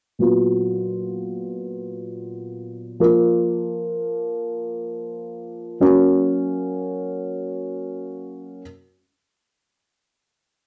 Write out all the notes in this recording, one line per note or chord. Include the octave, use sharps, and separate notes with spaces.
A#2 F#3 B3 F4
F3 A#3 F4
F#3 A#3 C#4 F#4